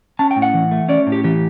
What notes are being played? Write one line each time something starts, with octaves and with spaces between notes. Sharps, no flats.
C#4 A5
G5
A2
F#5
E3
A3
C#4 D5
A2
G4
E3 G4